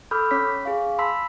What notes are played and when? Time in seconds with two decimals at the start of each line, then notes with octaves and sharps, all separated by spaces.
0.11 A4 B5 D6 E6 F6 G6
0.31 C#4 C#5 B6
0.63 G#4 F5 C#6
0.98 A5 B5 C6 E6 B6